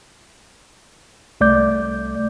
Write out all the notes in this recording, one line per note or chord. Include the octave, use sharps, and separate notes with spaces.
C2 A3 D5 D6 G6